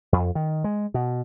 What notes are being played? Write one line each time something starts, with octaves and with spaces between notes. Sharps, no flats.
F2
D#3
G#3
B2